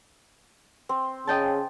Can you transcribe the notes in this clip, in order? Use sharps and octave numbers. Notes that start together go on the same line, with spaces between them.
C4
C#3 D#5 G5 A5